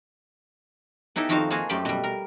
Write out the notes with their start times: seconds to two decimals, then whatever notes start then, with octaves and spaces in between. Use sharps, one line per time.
1.16 B3 D#4 E4 G4 A4
1.29 F2 D#3 D#4 F#4 C5 F5
1.50 A#3 F4 F#4 G#4 A5
1.69 F#2 A3 G4 D5 C6
1.85 B2 G3
2.04 A#4